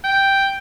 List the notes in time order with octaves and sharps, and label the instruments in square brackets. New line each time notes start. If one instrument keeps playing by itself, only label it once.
[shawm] G5